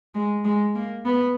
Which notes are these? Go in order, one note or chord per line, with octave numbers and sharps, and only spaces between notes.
G#3
G#3
A#3
B3